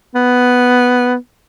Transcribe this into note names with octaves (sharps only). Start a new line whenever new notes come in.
B3